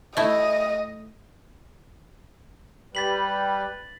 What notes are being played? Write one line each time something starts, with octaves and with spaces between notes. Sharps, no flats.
A3 E4 D#5
G3 B4 A6 B6 F#7